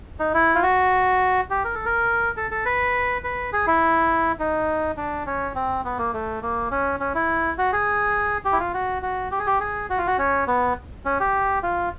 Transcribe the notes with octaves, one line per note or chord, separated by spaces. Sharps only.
D#4
E4
F4
F#4
G4
A#4
A4
A#4
A4
A4
B4
B4
G#4
E4
D#4
D4
C#4
C4
B3
A#3
A3
A#3
C#4
C#4
E4
F#4
G#4
G4
E4
F4
F#4
F#4
G4
G#4
G4
G#4
F#4
F4
F#4
C#4
B3
C#4
G4
F4